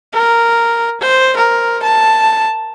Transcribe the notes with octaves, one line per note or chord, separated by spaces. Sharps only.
A#4
C5
A#4
A5